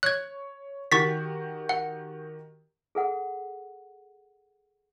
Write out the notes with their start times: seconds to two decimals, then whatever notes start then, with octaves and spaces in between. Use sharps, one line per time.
0.03 C#5 F#6 G#6
0.92 D#3 F#4 G4 C#6 A6 B6
1.69 F#5
2.95 G#4 A4 F#5